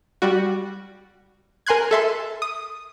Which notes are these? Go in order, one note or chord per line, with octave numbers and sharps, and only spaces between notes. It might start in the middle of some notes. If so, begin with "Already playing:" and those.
G3 F#4
A#4 G#5 C6 F#6 G#6
A4 E5 C6
D#6